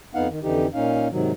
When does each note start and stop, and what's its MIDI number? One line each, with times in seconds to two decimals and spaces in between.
0.15 0.28 41
0.15 0.28 59
0.15 0.28 63
0.15 0.28 77
0.15 0.28 78
0.30 0.40 51
0.43 0.67 41
0.43 0.67 50
0.43 0.67 52
0.43 0.67 63
0.43 0.67 67
0.74 1.08 46
0.74 1.08 61
0.74 1.08 63
0.74 1.08 77
1.11 1.32 44
1.11 1.32 48
1.11 1.32 51
1.11 1.32 54